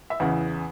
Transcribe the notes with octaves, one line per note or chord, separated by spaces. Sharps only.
E5
E2 C#3 E3 F#5